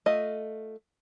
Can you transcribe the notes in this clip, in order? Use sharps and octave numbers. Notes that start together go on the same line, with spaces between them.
A3 F4 D#5